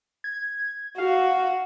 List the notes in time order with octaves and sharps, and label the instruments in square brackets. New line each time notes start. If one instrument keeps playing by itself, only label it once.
[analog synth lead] G#6
[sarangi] F#4 [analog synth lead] F5